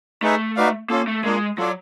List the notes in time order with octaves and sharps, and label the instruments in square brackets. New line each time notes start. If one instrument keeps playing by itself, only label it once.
[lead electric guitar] A3 [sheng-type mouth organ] D#4 G#4 B4 E5
[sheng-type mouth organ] D#4 F#4 B4 D5 F5
[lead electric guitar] A#3 [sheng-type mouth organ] C#4 F4 A4
[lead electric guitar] A3
[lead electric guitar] G#3 [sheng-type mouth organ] A#3 D4 F4
[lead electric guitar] F#3 [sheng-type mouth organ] F4 A4 D5